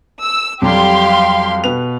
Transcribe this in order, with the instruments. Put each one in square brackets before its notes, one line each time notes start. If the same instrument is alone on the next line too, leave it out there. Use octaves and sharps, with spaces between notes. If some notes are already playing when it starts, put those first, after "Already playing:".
[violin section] E6
[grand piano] F2 F#3 G3 [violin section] G4 F5 C6
[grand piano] B2 B4 F7